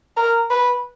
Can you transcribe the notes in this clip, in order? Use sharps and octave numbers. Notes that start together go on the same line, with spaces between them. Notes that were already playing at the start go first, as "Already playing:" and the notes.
A#4
B4